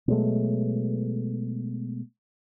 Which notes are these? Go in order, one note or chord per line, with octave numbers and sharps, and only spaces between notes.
B2 F#3 G#3 A3